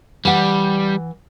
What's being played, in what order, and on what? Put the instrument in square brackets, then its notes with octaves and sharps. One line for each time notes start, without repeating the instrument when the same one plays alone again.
[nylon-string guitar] E3 F#5 [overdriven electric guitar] G3